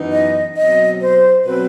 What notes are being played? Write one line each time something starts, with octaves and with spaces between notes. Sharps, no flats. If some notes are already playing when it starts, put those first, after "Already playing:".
Already playing: F#2 E3 B3 D#4
D#5
B2 F#3 C4 D#5
C5
B2 F#3 C4 B4